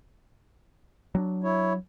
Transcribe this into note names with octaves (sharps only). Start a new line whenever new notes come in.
F#3 C4 D4
E4 C#5